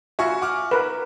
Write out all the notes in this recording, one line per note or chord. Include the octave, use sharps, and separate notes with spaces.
F4 F#4 E5 G#5 C#6
F#5 D6 F6
A#4 B4